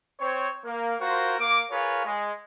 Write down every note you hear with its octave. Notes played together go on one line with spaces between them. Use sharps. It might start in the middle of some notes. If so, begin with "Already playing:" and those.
C4 C5 C#5
A#3
F4 F#4 A#4 C5
A#3 D6
F4 G#4 A#4 B4 C#5
G#3